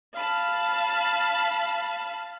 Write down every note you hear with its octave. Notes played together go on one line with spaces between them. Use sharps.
F5 A5 B5